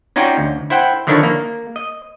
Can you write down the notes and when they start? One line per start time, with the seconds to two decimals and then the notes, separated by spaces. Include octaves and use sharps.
0.16 C#4 D#4 F4 F#4 D5 G5
0.37 D2
0.70 E4 C5 F#5 G5
1.07 D3 D#3 F3 D4 E4 C#5
1.23 A#3
1.76 D#5